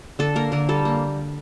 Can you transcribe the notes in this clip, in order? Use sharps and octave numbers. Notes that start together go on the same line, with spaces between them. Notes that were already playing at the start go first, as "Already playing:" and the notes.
D3 A4
A#3 A#4
D3 A#4
G3 A4
A#3